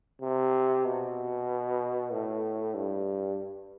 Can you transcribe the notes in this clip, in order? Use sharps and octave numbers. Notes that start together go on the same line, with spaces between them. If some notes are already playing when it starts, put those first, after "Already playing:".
C3
B2
A2
G2